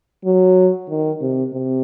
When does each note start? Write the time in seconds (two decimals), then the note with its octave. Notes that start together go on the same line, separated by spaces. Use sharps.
0.25 F#3
0.89 D#3
1.22 C3
1.53 C3